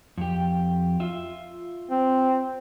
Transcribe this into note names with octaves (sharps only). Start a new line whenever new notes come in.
F2 G4
F4 E5
C4